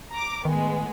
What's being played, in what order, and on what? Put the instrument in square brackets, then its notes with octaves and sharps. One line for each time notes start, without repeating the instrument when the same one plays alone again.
[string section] A#5 D6
[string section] A2 G#3 B3 [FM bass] D#3